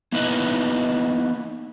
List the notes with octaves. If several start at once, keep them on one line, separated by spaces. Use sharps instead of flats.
A#3 B3 D#4 E4 B4 D#5